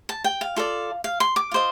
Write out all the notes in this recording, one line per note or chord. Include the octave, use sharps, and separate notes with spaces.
A5
G5
F5
F4 A4 D5
F5
C6
D6
F4 C5 D#5